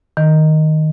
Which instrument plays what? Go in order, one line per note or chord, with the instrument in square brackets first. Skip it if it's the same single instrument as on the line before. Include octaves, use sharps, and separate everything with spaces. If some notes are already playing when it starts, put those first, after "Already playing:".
[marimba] D#3